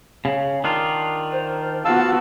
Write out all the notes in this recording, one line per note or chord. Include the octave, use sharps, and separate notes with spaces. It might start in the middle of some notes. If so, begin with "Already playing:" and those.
C#3
D#3 D4 F4
C5
B3 F4 F#4 F5 A5 E6